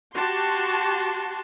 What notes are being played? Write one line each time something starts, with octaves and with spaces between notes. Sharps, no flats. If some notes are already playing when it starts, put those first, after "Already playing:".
F#4 G4 A5 C6